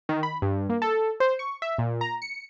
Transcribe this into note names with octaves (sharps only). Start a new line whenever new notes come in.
D#3
B5
G2
A#3
A4
C5
C#6
E5
A#2
A#5
C#7